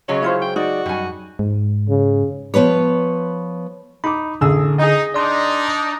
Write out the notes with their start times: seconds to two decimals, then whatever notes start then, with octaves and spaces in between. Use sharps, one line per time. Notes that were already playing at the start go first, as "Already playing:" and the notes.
0.08 C#3 F#3 G#3 C#4 C#5
0.22 E4 F4 C5
0.41 G5
0.56 D#4 F#4 D5
0.86 F#2 G3 G#5
1.39 G#2
1.89 C#3
2.54 F3 B3 B4 C#5
4.04 D#4 B5 D6
4.41 A1 D3 G#4 E6
4.78 D#4 G#4 D#5
5.14 D4 D#4 D5 C6